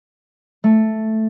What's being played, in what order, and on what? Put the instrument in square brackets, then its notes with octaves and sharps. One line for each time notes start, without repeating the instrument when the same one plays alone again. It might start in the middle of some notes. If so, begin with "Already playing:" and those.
[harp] A3